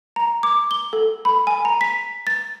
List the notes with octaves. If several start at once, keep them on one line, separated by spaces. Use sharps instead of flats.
A#5
D6
G7
A4
B5
G#5
A#5
B6
A6